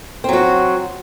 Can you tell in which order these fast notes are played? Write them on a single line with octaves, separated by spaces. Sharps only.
C4 F#3 F#4